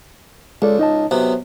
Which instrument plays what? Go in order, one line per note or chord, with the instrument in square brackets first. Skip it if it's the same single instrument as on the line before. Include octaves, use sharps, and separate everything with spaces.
[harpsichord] C#2 [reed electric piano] G#3 A4 D5
[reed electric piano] D#4 D#5 A5
[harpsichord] B1 C3 B3 [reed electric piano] C5